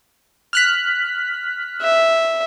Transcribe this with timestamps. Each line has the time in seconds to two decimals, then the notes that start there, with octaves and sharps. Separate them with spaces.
0.53 F6 F#6 B6
1.82 E5